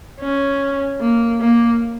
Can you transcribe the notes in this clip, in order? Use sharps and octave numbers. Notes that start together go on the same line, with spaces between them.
C#4
A#3
A#3